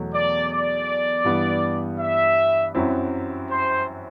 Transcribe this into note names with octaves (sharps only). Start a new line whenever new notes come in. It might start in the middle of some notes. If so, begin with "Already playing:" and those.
Already playing: E2 B2 F#3 A3
D5
D5
G2 E3 G3 B3
E5
F#2 F#3 C4 E4
C5